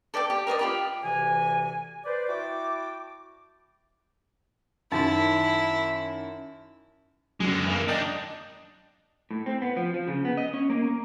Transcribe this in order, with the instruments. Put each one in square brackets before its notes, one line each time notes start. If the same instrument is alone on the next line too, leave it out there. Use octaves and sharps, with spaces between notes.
[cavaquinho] A4 D5 G5 D6
G4
A#4 C5 D5 D#5
F4 G4 B5
[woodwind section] D2 C3 E3 G#5
B4 C5 D5
E4 F#4 G5 A5 D6
[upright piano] F#2 D#3 [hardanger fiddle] E4 [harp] A5
[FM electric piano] F#2 [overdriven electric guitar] D3 G#3
[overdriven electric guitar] E3 A#3
[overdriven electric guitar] D4 D#4 [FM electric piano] D#5 G5
[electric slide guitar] A2
C4
B3
F3
F3
C#3
B3
D#5
C#4
A#3
A#3